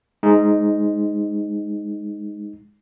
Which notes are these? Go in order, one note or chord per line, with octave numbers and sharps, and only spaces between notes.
G#3 D#4